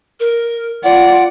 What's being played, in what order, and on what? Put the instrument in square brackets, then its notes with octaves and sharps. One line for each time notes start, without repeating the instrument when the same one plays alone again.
[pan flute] A#4
[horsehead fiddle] F4 D5 [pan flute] F#5